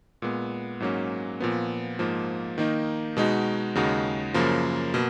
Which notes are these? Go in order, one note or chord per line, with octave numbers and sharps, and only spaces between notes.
A#2 G#3 B3
G#2 F#3 A#3 C#4
A#2 F3 B3
G#2 F3 A#3
D#3 A#3 D#4
B2 G#3 D#4 F#4
D#2 C#3 G#3 D#4 F#4
F#2 C#3 F3 A#3
B2 A#3